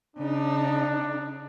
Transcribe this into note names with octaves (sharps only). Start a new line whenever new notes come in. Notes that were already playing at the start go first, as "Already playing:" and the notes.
C#3 D4 D#4